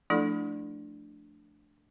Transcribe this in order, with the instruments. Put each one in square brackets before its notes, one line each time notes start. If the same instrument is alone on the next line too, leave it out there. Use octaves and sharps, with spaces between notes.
[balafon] F3 A3 D4 E4 A4